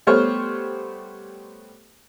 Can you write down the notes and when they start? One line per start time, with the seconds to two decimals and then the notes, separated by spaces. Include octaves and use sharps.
0.07 G3 A3 B3 C5 C#5 F6